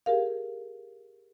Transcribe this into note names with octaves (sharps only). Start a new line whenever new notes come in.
G4 G#4 A#4 F5